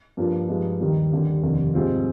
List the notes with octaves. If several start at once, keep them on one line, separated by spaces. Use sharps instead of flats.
G2 F3 A#3 D4 F4
G2 F3 G#3 D#4
D#2 D#3 G3
D#2 D3 G3
F1 D#2 D3
G#2 G3 C4 F4